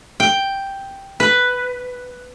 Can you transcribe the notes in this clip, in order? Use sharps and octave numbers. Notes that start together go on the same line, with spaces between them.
G5
B4